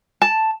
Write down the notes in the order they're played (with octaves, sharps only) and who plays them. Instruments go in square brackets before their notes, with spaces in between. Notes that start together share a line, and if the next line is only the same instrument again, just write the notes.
[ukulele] A5